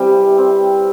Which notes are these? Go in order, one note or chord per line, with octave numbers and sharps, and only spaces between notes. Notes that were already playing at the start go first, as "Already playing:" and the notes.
Already playing: C3 E3 G3
C4